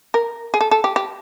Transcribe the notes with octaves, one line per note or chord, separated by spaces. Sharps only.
A#4
G#4
A4
A4
G4
G4